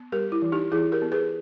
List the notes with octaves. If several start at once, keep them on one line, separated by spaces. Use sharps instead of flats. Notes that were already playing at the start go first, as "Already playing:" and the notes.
Already playing: B3
G3 G4 A#4
E4
E3
D#4 G4
E3 E4 G#4
G4 A#4
B3
G#4 B4